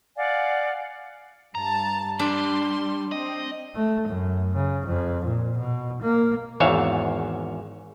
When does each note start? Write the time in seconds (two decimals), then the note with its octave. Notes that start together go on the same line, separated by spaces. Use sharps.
0.17 D5 F5 F#5 G#5
1.55 G2 A5 A#5
2.19 G3 D4 C6
3.12 C4 D#5
3.75 A3
4.08 F#2
4.54 C#3
4.86 F2
5.25 A#2
5.57 B2
6.02 A#3
6.60 G#1 E2 G#2 C#5 E5 F5